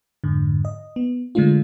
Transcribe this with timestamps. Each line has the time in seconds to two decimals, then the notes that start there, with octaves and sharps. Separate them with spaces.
0.24 F2 G#2 D3
0.65 D#5
0.96 B3
1.35 D3 G#3 A3 D4 F4